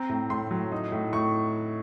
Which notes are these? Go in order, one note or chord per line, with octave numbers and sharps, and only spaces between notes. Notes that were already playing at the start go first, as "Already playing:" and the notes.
Already playing: C4 A#5
A2
A2 C6
F#3
D#4
A2
A2 C#6